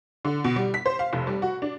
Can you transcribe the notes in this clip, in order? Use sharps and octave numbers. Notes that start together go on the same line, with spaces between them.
D3
B2
G3
B6
C5
F5
F1
G3
F#4
D4